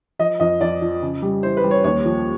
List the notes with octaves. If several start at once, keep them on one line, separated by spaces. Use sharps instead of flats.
F3 D#5
F2 D#5
F2 D5
F3
C#3
G3
E3 C5
B4
G3
C#5
D#2 C#5
F3